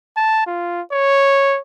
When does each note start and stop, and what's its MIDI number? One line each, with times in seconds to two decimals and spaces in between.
0.17 0.46 81
0.47 0.81 65
0.92 1.59 73